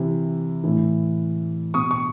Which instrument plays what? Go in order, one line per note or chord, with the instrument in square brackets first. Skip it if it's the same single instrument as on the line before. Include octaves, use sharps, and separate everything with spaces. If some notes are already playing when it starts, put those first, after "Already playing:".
Already playing: [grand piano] C3 E3
A2 E3
B2 C#6 D#6
C#6